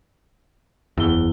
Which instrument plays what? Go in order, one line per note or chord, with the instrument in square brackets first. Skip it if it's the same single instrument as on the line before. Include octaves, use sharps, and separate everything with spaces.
[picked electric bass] F#1 E2 [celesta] E4 G7